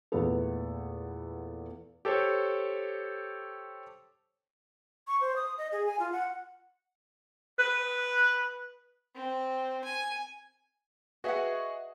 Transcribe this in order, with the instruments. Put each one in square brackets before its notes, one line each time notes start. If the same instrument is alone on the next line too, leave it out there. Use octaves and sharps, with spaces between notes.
[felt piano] E2 A#2 A3 B3 A4
[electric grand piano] G4 A4 C5 C#5
[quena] C#6
C5
D#6
D#5
G#4
G#5
F4
F#5
[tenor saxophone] B4
[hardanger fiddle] C4
G#5
[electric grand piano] F#4 G#4 [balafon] B4 [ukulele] D#5 E5 F#5